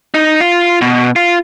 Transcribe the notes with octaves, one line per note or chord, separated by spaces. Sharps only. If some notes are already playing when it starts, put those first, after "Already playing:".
D#4
F4
B2
F4